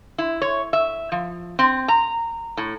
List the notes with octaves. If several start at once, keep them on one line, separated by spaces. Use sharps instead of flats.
E4
C#5
E5
F3
C4
A#5
A2